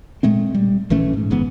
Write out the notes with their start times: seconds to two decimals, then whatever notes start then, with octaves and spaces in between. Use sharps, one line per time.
0.23 A#2 G#3 A3 C4
0.54 G3
0.90 A#1 E3 A3 C#4
1.13 G#2
1.30 F#1 G#2 E3 B3